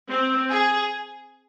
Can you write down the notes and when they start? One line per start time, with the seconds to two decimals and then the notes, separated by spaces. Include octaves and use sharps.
0.09 C4
0.50 G#4